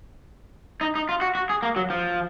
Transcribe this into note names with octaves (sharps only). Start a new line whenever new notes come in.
D#4
D#4
F4
F#4
F#4
G#4
A#3
F#3
F3